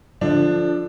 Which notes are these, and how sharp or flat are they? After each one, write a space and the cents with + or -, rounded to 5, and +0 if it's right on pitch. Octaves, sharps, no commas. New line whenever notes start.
D3 +0 F3 +0 D4 +10